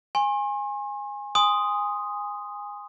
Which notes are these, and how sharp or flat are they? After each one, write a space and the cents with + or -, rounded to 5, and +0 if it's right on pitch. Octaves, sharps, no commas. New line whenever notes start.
G#5 -15 C6 +45
G#5 -20 C6 +0 D#6 +0